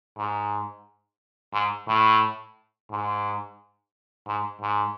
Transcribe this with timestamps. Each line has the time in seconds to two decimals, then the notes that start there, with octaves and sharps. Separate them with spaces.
0.18 G#2
1.53 G#2
1.88 A2
2.91 G#2
4.27 G#2
4.62 G#2